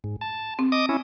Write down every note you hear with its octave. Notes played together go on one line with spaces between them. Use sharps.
G#2
A5
C4
D#5 D6 D#6
C#4 E4